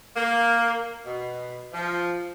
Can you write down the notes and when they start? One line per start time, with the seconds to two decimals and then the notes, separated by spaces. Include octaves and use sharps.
0.15 A#3
1.05 B2
1.73 F3